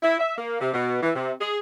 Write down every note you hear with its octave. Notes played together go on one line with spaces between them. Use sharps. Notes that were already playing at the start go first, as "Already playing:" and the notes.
E4
E5
A#3
C3
B2
E3
C3
G#4